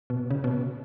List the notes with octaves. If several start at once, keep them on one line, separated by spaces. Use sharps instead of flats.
B2
C#3
B2